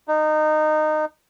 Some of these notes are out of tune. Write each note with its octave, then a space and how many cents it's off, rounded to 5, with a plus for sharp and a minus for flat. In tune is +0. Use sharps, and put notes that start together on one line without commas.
D#4 -20